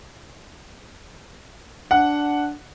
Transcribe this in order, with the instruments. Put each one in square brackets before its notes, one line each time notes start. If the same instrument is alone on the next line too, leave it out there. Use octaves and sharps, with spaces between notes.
[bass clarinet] D4 [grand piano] F#5